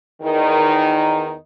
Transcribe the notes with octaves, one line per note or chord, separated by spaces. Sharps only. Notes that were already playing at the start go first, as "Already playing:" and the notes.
E2 D#3 D#4